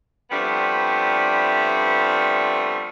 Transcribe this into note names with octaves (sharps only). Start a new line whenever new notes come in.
F3 G3 A3 B3 C4 D4